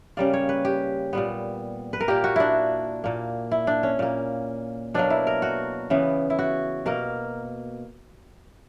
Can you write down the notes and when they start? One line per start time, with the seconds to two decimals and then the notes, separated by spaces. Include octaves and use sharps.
0.17 C#3 G3 A#3 D5
0.34 C#5
0.49 B4
0.65 G4
1.13 A#2 G3 B3
1.93 B4
2.00 A#4
2.08 A#2 A#3 G4
2.24 F#4
2.36 D4 E4
3.04 A#2 A#3
3.51 E4
3.67 D4
3.83 C#4
3.99 A#2 A#3
4.94 B2 F#3 A#3 D4
5.10 E4
5.27 A#4
5.42 F#4
5.90 C#3 E3 B3
6.30 E4
6.39 F#4
6.86 B2 A#3 A#4